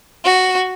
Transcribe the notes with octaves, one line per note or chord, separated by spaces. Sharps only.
F#4